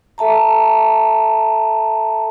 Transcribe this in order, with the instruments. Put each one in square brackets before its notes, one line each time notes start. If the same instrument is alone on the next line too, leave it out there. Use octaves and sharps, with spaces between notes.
[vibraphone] A4 E5 A5 A#5